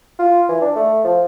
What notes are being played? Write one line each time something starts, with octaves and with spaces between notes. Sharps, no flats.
F4
E3
D4
A3
F3